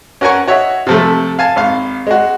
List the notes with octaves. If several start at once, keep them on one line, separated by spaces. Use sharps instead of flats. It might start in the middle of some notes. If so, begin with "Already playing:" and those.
C#4 F#4 A#4 F#5 G#5 C#6
F#4 C#5 D#5 E5
C3 F3 A3
F5 G#5 A5
G#1 F5
G#3 F#4